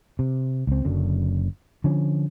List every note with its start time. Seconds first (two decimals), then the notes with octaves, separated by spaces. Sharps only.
0.19 C3
0.67 C#2 C4
0.85 F#1 F#2 D3
1.84 D3 F3 C#4